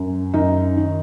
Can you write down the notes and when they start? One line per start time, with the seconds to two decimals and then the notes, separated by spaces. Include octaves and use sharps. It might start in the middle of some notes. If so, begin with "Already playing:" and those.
Already playing: F#2
0.34 F#2 D#4
0.77 D#3